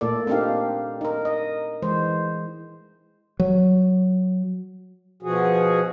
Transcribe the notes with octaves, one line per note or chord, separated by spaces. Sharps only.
A#2 A3 A#3 A4 D5
A#3 C4 D4 D#4 G4 F5
D#4 A#4
D#5
E3 G#3 C5
F#3
B2 F3 F#4 G#4